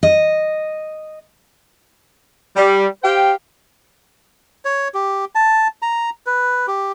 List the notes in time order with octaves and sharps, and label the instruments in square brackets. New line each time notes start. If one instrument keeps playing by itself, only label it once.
[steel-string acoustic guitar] D#5
[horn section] G3
G4 C5 F5 G5
[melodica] C#5
G4
A5
A#5
B4
G4